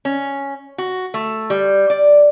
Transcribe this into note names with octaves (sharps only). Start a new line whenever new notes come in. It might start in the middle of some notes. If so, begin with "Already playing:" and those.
C#4
F#4
A3
G3
D5